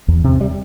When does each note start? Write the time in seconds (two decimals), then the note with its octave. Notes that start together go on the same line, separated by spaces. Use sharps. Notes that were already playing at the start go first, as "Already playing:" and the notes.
0.08 E2
0.24 C3
0.41 G3